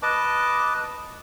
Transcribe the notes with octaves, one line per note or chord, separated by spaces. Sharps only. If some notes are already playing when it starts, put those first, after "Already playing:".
B4 D#5 A5 D6